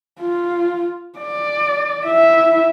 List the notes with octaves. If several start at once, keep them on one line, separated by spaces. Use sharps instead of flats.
F4
D5
E4 E5